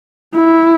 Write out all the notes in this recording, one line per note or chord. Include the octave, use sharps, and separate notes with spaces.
E4